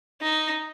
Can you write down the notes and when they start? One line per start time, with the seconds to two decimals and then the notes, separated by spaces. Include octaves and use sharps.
0.21 D#4